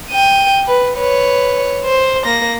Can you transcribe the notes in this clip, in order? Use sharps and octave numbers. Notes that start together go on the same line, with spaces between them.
G5 D#7
B4
B4 C#5
C5
A#3 A#6